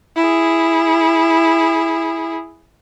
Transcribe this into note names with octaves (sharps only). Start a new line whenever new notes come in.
E4 G#4